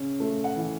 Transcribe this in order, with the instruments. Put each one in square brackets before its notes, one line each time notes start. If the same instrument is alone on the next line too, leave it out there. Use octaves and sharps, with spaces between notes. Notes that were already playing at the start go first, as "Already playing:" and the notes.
Already playing: [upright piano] C#3 C#4
A3
F#5
E3